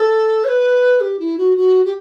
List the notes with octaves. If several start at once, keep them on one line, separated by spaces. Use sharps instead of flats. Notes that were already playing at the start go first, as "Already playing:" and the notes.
Already playing: A4
C#5
B4
G4
E4
F#4
F#4
G4